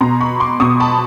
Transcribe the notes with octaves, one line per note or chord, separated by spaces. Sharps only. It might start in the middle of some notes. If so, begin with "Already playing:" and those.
B2 A#5 C6
B5 C#6
C6 D6
B2 C#6 D#6
A5 B5